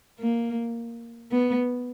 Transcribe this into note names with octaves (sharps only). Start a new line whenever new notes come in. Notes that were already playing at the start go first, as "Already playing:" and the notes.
A#3
B3